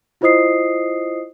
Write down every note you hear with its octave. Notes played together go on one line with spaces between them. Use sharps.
E4 F4 C5 D#5 D#6 C7